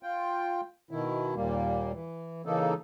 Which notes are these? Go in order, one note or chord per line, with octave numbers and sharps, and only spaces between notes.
F4 G5
B2 D#3 E4
D#2 A#2 G3 A#3
E3
C#3 E3 A#3 D#4 A4